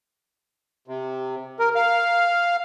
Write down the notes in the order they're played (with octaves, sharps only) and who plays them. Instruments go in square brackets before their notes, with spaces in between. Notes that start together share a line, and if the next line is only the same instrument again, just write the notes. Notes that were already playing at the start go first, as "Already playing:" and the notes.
[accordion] C3
A#4
F5